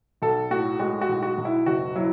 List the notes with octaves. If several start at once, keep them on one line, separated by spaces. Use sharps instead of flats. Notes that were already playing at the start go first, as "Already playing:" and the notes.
B1 A4
A2 F#4
G#3 F#4
F#4
B1
F#4
B1
E4
F#1 F#4
F#3 E4